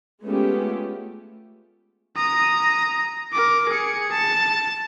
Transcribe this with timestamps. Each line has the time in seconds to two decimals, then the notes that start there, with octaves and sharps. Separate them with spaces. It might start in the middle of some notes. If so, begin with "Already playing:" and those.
0.23 G#3 A3 B3 C#4 F4 G4
2.17 A#5 D#6
3.33 A#4 D6
3.69 G#4 C#7
4.12 A5